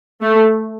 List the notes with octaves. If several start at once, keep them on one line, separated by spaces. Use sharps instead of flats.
A3